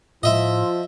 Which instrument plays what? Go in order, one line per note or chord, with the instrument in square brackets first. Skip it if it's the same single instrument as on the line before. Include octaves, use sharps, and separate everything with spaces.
[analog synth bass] A2 [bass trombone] F3 [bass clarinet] F4 [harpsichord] D#5 E5